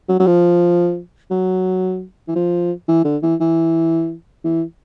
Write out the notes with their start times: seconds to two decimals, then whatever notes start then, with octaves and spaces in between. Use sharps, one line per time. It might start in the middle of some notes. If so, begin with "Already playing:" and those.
0.09 F#3
0.19 F#3
0.26 F3
1.31 F#3
2.28 E3
2.35 F3
2.88 E3
3.05 D3
3.22 E3
3.40 E3
4.44 E3